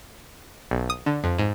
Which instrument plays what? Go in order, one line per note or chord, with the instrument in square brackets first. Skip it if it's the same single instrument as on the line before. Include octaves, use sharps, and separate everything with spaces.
[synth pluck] B1
D#6
D3
F2
G#2